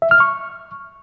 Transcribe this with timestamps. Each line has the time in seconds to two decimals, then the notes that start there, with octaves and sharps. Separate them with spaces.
0.02 E5
0.11 F6
0.20 C#6